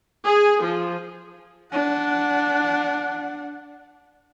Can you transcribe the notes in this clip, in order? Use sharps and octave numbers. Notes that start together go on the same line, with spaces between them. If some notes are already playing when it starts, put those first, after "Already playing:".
G#4
F3
D4 F#5